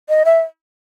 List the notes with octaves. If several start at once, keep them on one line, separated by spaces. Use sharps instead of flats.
D#5
E5